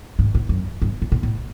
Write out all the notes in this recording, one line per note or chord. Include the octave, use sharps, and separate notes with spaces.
G#2
A2
F#2
G2
A2
A#2
A2